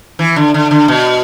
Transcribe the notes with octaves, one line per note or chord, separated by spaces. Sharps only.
E3
D3
D3
D3
B2